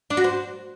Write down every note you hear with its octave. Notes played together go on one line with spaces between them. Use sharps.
D4
F#4
C5